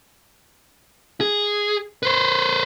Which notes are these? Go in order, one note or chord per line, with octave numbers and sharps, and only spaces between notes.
G#4
B4 C5